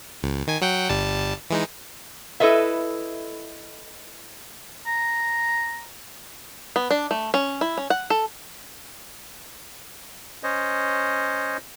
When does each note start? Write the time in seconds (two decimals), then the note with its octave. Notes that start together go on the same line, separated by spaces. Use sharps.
0.23 C#2
0.47 D#3 G#5
0.62 F#3 F#5 G5
0.89 G1 G3 A5
1.50 E3 G#3 D#4
2.40 E4 A4 B4 D#5 E5
4.87 A#5
6.76 B3
6.91 D4
7.11 A3
7.34 C#4
7.61 E4
7.78 C#4
7.90 F#5
8.10 A4
10.43 C#4 C5 C#5 D#5